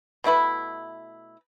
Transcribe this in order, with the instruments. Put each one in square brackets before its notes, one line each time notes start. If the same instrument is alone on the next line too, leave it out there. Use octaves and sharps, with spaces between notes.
[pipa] B2 A3 E4 B4